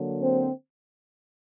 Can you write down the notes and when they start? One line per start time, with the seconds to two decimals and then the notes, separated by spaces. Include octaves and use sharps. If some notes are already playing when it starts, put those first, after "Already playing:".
Already playing: D3 F#3 A#3
0.20 C4 C5